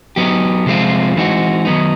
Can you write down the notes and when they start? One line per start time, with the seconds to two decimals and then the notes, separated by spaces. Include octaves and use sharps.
0.16 F#3 B3 D#4 G4
0.66 C3 F3 G#3 C4 F4
1.16 E3 G#3 C4 D#4 F#4
1.65 D#3 F#3 B3 D#4